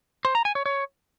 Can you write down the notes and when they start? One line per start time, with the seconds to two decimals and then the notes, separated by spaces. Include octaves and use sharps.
0.25 C5
0.35 A#5
0.45 G#5
0.55 C#5
0.66 C#5